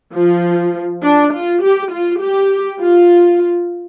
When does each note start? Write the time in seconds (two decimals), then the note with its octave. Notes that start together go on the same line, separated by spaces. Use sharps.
0.15 F3
1.03 D4
1.33 F4
1.62 G4
1.92 F4
2.22 G4
2.81 F4